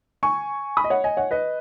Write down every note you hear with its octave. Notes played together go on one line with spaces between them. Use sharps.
G#5 C#6
B5 D#6
D#5
C#5 F#5
D#5 G#5
C#5 F#5
B4 D#5